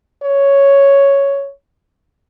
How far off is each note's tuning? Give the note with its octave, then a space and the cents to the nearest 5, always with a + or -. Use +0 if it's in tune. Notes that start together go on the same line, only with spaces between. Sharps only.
C#5 +5